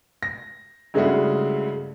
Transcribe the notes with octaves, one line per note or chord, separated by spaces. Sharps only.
A#6
G2 C#3 G#3 A3 E4 F#4